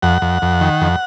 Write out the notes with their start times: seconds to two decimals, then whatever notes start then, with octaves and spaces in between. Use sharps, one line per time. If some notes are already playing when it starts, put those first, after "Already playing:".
0.03 F2 F#5
0.22 F2
0.42 F2
0.61 D#3
0.81 F2